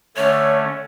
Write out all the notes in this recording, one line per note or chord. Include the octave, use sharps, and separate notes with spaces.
D3 A3 C#4 C#5